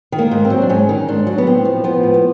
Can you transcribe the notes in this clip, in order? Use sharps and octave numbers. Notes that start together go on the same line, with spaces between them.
D#3
A#3
G#2
C4
F#3
D4
G#2 C#4
D#3
G#2 D4
F#3
B3
A2 C4
F3
F3 B3
A2
B3